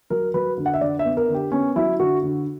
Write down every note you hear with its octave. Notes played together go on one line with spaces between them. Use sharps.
F#3 A#4
F#3 B4
D3
F#5
E5
D3 D5
E5
B3
A#4
D3
G4
B3 C#4
F#3 E4
D3 F#4
D3